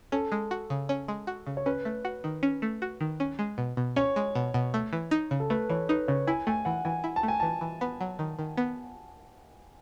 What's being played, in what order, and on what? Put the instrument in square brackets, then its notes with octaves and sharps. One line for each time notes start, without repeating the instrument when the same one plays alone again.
[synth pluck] C#4 [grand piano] A4
[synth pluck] G#3
F#4
C#3
C#4
G#3
F#4
C#3
[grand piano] C#5
[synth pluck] C#4 [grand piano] B4
[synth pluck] A3
F#4
D#3
C#4
A3
F#4
D#3
C#4
G#3
B2
B2
[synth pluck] C#4 [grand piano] C#5
[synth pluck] G#3
B2
B2
A3
E3
D#4
C#3
[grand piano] A4
[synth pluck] A3 [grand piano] B4
[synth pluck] E3 [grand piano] C#5
[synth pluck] D#4 [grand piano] B4
[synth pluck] C#3 [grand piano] C#5
[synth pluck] E4 [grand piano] G#5
[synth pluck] A3 [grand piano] G#5
[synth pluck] E3 [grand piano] F#5
[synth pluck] E3 [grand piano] G#5
[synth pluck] E4
[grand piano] A5
[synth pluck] A3
[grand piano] G#5
[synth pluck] E3 [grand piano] A5
[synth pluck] E3
B3
F#3
D#3
D#3
B3